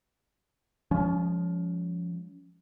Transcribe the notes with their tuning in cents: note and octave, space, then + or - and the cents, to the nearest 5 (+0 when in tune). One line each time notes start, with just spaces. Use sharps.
F3 +0 G#3 -20 C#4 +25